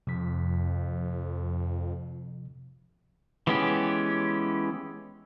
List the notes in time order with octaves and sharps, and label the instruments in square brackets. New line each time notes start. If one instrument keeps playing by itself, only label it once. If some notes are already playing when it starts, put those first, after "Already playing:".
[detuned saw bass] F2 [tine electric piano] C3 F3 B6
[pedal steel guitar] E3 G#3 B3 C#4 G4